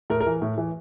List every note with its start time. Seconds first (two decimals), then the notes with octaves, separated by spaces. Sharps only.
0.10 A2 A#4
0.21 A#4
0.26 E3
0.42 A2
0.58 E3